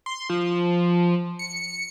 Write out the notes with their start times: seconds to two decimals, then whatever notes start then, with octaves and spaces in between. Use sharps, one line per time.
0.06 C6
0.30 F3
1.39 C#7